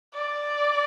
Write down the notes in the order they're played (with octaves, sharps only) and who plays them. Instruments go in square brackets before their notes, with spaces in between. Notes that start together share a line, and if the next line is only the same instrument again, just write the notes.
[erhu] D5